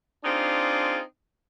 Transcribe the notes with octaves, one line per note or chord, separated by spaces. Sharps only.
C4 D4 D#4 F4 G#4